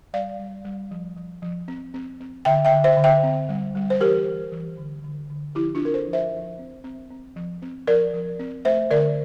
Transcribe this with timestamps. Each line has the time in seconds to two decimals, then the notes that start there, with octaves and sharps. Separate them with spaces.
0.13 G3 D5 F5
0.40 G3
0.65 G3
0.91 F3
1.17 F3
1.42 F3
1.68 C4
1.94 C4
2.20 C4
2.45 D3 E5 G5
2.65 E5 G5
2.72 D3
2.84 C5 E5
2.97 D3
3.04 E5 G5
3.23 C4
3.49 G3
3.75 G3
3.90 C5
4.01 E3 G4 A#4
4.26 E3
4.52 E3
4.78 D3
5.04 D3
5.30 D3
5.55 F3 E4 G4
5.75 D4 F4
5.81 C4 A#4
5.94 A4 C5
6.07 F3
6.13 C5 E5
6.33 F3
6.59 C4
6.84 C4
7.10 C4
7.36 F3
7.62 C4
7.87 F3 A#4 D5
8.13 F3
8.39 C4
8.65 A3 C5 E5
8.91 D3 A#4 D5